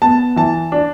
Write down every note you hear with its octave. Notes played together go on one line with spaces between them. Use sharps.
B3 A5
E3 A5
D4